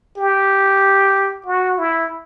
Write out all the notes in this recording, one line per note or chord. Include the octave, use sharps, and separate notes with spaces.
G4
F#4
E4